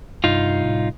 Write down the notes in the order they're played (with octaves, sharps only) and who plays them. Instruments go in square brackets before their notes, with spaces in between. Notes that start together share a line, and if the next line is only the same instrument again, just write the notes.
[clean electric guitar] C2 D#4 F4 [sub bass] G2
[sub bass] A2